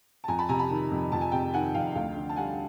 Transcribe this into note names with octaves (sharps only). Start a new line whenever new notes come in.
A5
F2 G#5 A#5
A5 B5
C3 G#5 A#5
A5 B5
D#3
F2
F2 A5
G#5
C3 G5 A5
D#3 F#5 G#5
F2 F5 G5
D2 F5 G5
D3
A5
G3 F#5 G#5